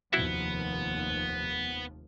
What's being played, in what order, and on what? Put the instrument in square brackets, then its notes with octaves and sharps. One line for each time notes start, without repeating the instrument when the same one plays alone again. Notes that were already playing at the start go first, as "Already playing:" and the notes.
[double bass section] F1 D#2 F3 [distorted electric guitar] B3 [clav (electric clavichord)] E4 F#4 E5